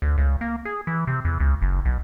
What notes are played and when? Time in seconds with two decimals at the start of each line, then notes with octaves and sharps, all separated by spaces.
0.02 D2
0.18 C#2
0.41 A#3
0.65 G#4
0.87 E3
1.07 C3
1.25 E2
1.40 C#2
1.62 F#1
1.85 B1